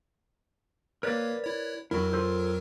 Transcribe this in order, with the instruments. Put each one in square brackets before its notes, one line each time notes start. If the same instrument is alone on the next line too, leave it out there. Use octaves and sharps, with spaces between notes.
[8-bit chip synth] A#3 C#5 [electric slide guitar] A#4 B4 D5
[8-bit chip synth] E4 C#5
[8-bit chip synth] F2 F#3 A#4 [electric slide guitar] E4 F#4
[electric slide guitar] F4 A4 C5